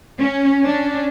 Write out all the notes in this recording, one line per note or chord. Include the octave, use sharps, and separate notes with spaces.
C#4
C#4 D4